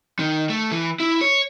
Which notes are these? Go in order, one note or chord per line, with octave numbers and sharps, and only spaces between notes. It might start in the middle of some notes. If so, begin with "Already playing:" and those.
D#3
A3
E3
E4
C#5